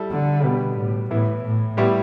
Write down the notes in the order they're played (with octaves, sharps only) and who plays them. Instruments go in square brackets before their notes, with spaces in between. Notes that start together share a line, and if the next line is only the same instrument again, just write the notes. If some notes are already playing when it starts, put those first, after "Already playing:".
Already playing: [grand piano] G3 E4 A4
[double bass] D3
[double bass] B2 [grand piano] G3 B3 G4 B4
[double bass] A2
[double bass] A2 [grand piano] E3 B3 E4
[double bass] A2
[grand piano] A2 G3 B3 E4 G4